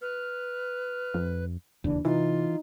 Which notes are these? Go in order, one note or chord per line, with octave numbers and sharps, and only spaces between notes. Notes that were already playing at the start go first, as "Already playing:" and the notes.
B4 F6
F2
E1 D#2 C#3 E3 D4
C3 E3 D#4 F4